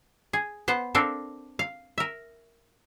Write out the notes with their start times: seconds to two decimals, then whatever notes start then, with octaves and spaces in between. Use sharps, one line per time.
0.33 G#4
0.68 B3 C5 F#5
0.95 C4 D4 A4 A#4 F5
1.59 F5
1.98 A#4 E5